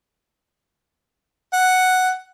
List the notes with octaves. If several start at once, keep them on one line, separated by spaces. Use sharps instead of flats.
F#5